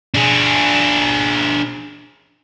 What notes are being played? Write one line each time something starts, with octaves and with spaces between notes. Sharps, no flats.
D4 G#4